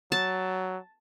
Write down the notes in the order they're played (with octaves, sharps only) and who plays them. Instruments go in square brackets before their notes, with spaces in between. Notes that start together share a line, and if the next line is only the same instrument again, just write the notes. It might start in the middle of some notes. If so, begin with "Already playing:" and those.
[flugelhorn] F#3 [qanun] A5